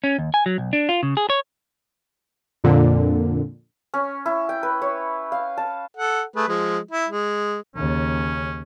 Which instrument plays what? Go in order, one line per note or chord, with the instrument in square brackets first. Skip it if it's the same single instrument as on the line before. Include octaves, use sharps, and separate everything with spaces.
[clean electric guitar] C#4
D#2
G#5
F#3
B1
D4
F4
C#3
G#4
C#5
[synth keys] F2 A#2 D3
[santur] C#4
E4
G5
B4
C#5
F5
A5
[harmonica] A4 F#5
A3 G#4 B4
F3 G#3
E4
G#3
[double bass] D#2 C#3 [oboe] C#4